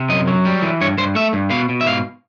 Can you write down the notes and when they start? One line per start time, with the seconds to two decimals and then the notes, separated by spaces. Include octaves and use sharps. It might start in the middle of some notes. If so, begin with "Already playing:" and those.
Already playing: C3
0.09 F#2 D#5
0.27 F#3
0.45 G3
0.62 E3
0.81 G2 C#5
0.98 G2 C5
1.15 A3 E5
1.33 G2
1.50 B2 F5
1.69 B2
1.81 E5
1.86 G#2 F5